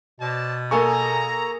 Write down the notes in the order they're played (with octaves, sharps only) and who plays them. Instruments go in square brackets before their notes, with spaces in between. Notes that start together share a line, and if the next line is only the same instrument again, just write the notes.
[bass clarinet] B2 [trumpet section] C5 D5 A5
[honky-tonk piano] A#3 G#4 [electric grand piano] A4 G#5 C#6 [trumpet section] A#5